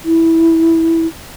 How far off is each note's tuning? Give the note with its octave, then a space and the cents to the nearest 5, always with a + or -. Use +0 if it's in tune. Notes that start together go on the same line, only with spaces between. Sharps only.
E4 -10